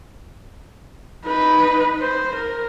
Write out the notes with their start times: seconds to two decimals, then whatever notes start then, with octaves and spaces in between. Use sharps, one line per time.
1.25 D#4 B4
2.01 C5
2.35 A#4